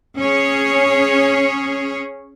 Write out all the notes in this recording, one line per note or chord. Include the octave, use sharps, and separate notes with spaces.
C#4 G#4 C#5